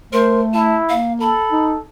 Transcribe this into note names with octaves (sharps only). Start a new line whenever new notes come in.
A3 A#4 C5
E4 A5
A#3 F5
A4 B5
D#4